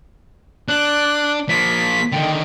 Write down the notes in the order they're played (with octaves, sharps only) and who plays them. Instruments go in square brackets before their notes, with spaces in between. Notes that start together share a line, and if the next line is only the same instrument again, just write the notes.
[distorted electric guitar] D4 [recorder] F#6
[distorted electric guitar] F3 A#3 [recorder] B6
[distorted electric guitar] D3 D#3 [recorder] G5